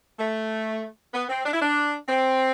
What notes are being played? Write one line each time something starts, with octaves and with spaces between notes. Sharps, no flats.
A3
B3
C4
D4
E4
D4
C4